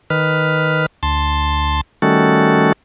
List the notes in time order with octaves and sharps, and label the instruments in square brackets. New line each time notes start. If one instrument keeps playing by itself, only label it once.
[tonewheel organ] D#3 B4 F6
D2 A5 C6
D#3 G3 A3 C#4 F#4 A4